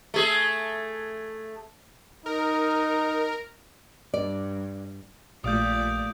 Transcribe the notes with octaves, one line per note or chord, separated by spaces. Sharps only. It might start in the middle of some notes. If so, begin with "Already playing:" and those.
A3 G#4
D#4 A#4
G2 D5
A#1 A#2 A3 F4 G4 D5 D#6 G6